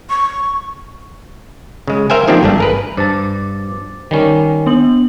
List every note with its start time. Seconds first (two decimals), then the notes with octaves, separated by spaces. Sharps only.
0.10 C#6
1.88 C#3 G#3
2.10 A#4 C5 E5 F5 G5 G#5
2.27 D#3 F3 A#3 C4 D4 G4
2.43 G#1 G2 A3 D4
2.58 G#4 A#4 B4
2.97 G2 C5 A5 D6 A6
4.11 D#3 G3 C#4
4.66 B3 D4 F#7